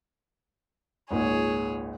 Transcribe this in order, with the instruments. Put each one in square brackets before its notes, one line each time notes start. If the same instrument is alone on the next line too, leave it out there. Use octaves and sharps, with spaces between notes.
[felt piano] G#1 C#2 A#2 [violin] G#4 C#5